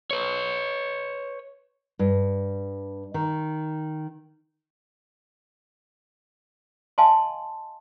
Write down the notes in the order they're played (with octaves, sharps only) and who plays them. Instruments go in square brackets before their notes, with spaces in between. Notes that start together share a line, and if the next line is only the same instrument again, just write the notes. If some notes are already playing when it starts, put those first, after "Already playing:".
[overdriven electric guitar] B4 C#5
[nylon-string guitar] G2
D#3
[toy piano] D#5 F5 G#5 A5 C6